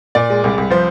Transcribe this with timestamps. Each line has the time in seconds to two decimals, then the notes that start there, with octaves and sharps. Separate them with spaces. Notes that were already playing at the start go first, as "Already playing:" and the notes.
0.15 A#2 D5
0.30 G#3
0.44 C2
0.58 C2
0.70 F3 C5